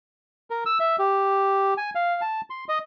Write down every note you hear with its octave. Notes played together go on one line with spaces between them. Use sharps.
A#4
E6
E5
G4
G#5
F5
A5
C6
D#5